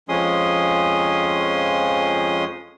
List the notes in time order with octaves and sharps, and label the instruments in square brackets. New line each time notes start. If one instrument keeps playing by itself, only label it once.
[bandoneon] F2 F3 G#3 C#4 C6 D#6